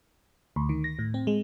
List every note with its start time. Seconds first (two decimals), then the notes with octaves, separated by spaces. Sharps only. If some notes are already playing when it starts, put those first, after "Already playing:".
0.56 D2
0.69 D#3
0.84 A#6
0.99 A2
1.14 C4
1.27 G#3